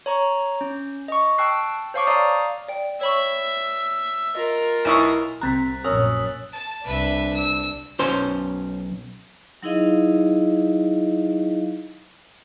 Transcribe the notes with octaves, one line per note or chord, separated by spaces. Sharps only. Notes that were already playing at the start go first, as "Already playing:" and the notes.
C#5 A#5 C#6
C#4
D#5 C#6
G5 A5 C#6 E6 F#6 C7
C5 C#5 F5 A5 C#6 D6
D5 F5 A#5 D#6
D5 G5
C#5 E5 B5 C#6
F4 A#4 D#5
B1 E4 C#6 D#6 E7
C2 C3 C4 A#5 F#6 A6 B6
A#1 F#2 B2 C#4 A#4 D#6 E6
A5
C2 D4 B4 E5
E6
B1 C#4 C5
F#3 D#4 E4 G#4 D#5 F5